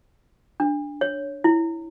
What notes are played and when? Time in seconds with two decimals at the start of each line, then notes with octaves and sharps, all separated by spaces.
0.60 D4
1.01 C#5
1.44 E4